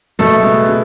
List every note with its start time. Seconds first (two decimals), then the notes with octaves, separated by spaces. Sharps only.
0.19 B2 A3
0.43 G#3 B3
0.68 B2